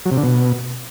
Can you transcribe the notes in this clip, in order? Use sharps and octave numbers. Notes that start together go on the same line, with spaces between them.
F#3
C3
D3
B2